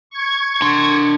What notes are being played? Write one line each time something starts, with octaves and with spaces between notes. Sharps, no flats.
C#6 G#6
D4 C6